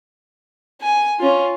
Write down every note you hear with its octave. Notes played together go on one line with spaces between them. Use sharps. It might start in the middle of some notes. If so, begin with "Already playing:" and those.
G#5
C#4 F4